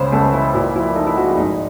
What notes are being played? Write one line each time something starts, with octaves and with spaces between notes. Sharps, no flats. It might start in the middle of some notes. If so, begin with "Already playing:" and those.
Already playing: C#2 C#3 G#3 C5 C#5
C#2 A4
E3 E4
A#2 E4
F3 E4
A3 D#4
E4
F3 F#4
G#4
G#1 D#4